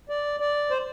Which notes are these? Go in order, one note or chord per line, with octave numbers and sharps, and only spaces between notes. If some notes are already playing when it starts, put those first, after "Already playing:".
D5
D5
C5